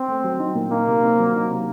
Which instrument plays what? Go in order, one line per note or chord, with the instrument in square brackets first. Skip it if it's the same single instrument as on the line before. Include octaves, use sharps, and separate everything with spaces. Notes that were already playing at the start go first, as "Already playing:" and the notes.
Already playing: [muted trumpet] C4
[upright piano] A3
F#3
D#4
A#2
[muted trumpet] A#3 [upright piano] D#4
[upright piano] C3
C4
F#3
D#4
C3